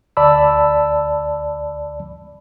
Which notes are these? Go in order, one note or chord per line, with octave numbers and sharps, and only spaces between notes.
D2 D5 A5 B5 E6